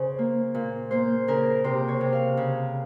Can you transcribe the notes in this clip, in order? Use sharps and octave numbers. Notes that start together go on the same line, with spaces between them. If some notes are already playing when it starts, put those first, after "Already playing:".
Already playing: C#3 C5
A#3
A#2
A#3 C5
C#3 A#4
C3 C5
C#5
C3
F5
C#3